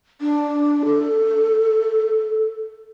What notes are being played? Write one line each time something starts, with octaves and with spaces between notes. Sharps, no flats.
D4
A4